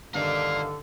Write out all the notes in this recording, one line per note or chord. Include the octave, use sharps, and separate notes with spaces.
G2 D3 D#3 A#4 D5 F5